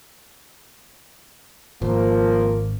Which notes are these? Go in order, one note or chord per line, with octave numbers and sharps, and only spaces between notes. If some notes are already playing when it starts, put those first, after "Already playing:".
G#1 F3 A#3